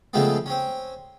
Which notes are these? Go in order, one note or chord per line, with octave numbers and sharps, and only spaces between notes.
C#3 F3 G#3 A3 B3 C4
C4 C#4